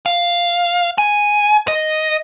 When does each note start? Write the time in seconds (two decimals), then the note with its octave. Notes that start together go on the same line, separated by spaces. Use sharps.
0.06 F5
0.98 G#5
1.68 D#5